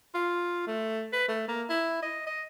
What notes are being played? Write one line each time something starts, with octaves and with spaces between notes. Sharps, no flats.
F4
A3
B4
A3
A#3
E4
D#5
D#5